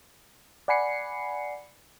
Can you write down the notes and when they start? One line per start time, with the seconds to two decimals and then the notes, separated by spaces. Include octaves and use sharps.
0.68 D5 F#5 G#5 B5 C7 C#7